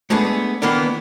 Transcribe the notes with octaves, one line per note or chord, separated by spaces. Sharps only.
G#3 A3 B3 D4 G#4
D#3 E3 A#3 B3 D4